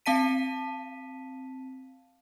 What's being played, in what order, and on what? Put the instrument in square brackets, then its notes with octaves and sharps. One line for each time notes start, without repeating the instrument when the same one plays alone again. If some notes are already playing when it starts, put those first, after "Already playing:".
[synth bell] C4 F5 A5 B6 D#7